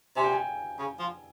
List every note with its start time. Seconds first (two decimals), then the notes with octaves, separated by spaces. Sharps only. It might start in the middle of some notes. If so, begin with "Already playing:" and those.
0.16 C3 G#5
0.24 G5
0.32 G#5
0.79 C#3
0.99 F3